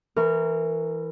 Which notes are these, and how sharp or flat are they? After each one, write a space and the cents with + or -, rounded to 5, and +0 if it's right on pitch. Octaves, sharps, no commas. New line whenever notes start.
E3 +0 A#4 -25 C#6 +15